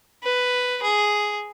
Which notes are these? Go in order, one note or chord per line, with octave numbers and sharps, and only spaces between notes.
B4
G#4